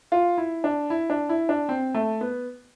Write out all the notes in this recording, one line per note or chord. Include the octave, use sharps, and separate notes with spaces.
F4
E4
D4
E4
D4
E4
D4
C4
A3
B3